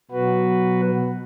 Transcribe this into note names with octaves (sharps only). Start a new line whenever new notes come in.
B2 F#3 F#4 B4